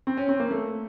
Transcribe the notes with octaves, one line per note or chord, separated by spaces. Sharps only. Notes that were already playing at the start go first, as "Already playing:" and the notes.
C4
C#4
C4
A#3
A3